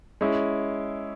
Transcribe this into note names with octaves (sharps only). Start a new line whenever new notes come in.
G#3 C#4 E4